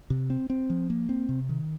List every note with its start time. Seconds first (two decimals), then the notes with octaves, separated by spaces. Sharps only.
0.10 C3
0.30 C4
0.50 C4
0.70 F3
0.90 A#3
1.09 C4
1.29 C3
1.49 D#3